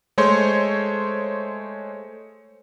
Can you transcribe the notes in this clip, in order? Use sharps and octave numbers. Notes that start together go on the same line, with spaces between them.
G#3 A3 C5 C#5 C6